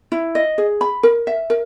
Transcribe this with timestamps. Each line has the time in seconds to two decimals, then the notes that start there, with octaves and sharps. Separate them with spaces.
0.12 E4
0.35 D#5
0.58 G#4
0.81 B5
1.03 A#4
1.27 E5
1.50 A#4